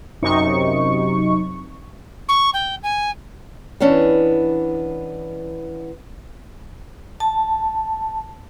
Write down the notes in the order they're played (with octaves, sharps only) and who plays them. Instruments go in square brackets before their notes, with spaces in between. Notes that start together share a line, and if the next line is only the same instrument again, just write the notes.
[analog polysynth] F#2 C3 D#4 C#6
[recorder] C#6
G5
G#5
[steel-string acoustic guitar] E3 B3 C#4 D4
[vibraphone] A5